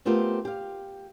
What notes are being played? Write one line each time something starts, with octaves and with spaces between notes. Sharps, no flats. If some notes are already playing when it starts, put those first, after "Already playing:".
A3 B3 C4 F4 G4 A#4
G4 F5